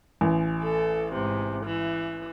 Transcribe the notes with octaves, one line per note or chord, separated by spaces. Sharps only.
A1
A4
G#2 C3
E3